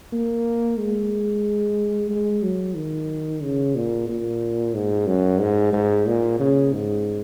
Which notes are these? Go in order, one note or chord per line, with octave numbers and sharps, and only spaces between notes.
A#3
G#3
G#3
F#3
D#3
C#3
A#2
A#2
G#2
F#2
G#2
G#2
A#2
C#3
G#2